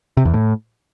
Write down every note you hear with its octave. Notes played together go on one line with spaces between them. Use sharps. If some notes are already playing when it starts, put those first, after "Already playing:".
C3
E2
A2